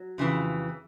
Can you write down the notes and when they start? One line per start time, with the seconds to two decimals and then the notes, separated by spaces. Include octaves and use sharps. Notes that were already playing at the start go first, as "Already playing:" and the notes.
Already playing: F#3
0.18 F2 C#3 E3